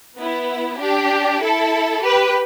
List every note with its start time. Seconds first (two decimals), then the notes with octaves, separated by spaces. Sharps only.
0.18 B3 E4
0.80 D4 G4
1.42 E4 A4
2.03 G4 B4